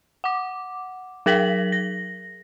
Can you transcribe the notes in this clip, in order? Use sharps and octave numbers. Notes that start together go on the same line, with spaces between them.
F#5 D6
F#3 G#4 A#4 A#6 B6 F#7
A#6